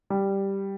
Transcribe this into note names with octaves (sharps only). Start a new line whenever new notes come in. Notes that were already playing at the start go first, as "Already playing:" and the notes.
G3